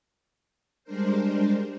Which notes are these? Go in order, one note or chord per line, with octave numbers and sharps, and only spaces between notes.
G3 G#3 D4 A#4 C5